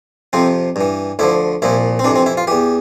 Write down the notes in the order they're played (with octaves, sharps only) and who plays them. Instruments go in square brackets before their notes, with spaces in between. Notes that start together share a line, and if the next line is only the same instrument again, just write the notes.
[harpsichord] F2 C3 F3 C4
G2 E3
D2 D3 F3 E4
C2 A#2 F3 E4
C4
F2 C3 E3 D4
C4
E4
F4
E2 E3 G4